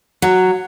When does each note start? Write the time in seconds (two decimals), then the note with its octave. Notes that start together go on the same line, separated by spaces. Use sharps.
0.22 F#3